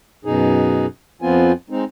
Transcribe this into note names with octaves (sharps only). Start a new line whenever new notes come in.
F#2 B2 D#4 G#4
F2 F3 B3 C4 F4 G#5
G#3 C4 D#4